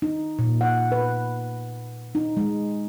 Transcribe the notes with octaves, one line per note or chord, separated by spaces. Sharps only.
D#4
A#2
F#5
B4
D#4
G#3